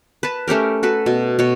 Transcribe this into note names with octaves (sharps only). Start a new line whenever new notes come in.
B4 A5
A3 C#4 G4 A#4
F#4 A4 B4
B2
B2 C#5